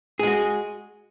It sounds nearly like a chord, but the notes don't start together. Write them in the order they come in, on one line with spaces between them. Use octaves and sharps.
G#4 G#3 F#4